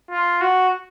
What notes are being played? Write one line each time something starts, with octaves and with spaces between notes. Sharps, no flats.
F4
F#4